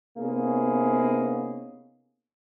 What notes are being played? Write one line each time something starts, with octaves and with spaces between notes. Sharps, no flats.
C3 A#3 B3 C#4 D#4 G#4